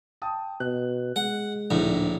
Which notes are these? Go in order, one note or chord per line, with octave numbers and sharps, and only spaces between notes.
G5 A5 D#6
B2 F#6
G#3 F#5
D1 A#1 A2 D4 D#4